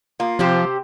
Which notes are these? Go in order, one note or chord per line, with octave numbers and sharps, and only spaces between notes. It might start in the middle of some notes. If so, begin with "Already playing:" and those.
A#3 F4
C3 F3 G4 C5